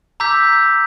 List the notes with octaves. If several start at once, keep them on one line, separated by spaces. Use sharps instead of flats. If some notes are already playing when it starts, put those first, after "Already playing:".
A#5 D6 E6 G6 B6